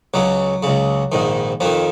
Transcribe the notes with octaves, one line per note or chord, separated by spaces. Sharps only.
C#2 C#3 F#3
C#2 C#3
A#1 G#2 D#3
F2 D#3 F3